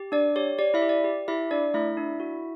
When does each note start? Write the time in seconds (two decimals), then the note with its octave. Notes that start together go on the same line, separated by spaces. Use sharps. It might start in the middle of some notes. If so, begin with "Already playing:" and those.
Already playing: G4
0.12 D4 D5
0.36 G4 C#5
0.59 G4 D5
0.74 E4 E5
0.82 G4
0.89 D5
1.04 G4
1.28 E4 G4 E5
1.51 D4 D5
1.74 A3 E4 E5
1.97 D4
2.20 F#4